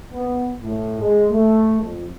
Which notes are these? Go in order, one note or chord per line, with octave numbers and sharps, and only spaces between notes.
B3
A2
G#3
A3
F2